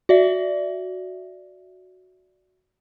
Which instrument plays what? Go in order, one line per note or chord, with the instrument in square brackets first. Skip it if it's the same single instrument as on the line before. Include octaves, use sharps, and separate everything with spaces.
[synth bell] F#4 D5 E5